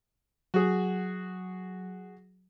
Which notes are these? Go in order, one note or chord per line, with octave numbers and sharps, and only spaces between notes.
F#3 F#4 G#4